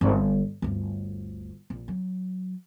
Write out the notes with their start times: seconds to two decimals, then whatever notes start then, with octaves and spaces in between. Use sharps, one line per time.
0.01 G1
0.62 G1 D2
1.70 A#1
1.88 F#3